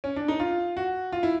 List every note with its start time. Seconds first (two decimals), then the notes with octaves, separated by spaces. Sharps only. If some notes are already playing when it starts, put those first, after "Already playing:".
0.04 C#4
0.16 D4
0.28 D#4
0.40 F4
0.77 F#4
1.12 F4
1.23 E4